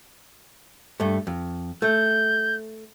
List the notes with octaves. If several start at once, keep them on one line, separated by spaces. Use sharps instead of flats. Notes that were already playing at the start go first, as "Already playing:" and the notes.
G2 A3
F2
A3 G6